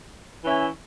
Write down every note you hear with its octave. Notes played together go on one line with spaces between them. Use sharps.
E3 C#4 E4